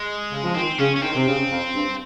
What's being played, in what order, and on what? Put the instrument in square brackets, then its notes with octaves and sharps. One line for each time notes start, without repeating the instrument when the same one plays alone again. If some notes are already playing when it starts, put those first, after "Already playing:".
Already playing: [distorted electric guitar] G#3
[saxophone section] C#3
F3
[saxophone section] D#3 [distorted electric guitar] C4
[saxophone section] C#3 [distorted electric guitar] C#4
[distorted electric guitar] C#4
[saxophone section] D#3 [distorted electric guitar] C4
[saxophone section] C3
C#3
F2
G2